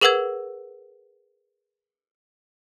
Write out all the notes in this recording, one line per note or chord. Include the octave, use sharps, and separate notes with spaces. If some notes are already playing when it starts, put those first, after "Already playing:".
G#4 A#4 B4 F#5 E6 G#6